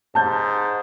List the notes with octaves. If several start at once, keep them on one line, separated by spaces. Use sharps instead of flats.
G#2 A5 G6